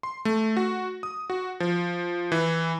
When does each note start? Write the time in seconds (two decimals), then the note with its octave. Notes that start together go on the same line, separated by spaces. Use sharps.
0.03 C6
0.25 A3
0.57 F#4
1.03 D#6
1.30 F#4
1.60 F3
2.32 E3